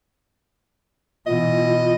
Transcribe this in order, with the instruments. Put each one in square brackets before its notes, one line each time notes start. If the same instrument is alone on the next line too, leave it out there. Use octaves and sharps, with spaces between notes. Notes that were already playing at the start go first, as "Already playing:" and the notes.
[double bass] B2 E3 [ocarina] F4 [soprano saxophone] D#5